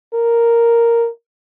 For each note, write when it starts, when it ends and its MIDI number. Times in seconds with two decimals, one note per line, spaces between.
0.14 1.08 70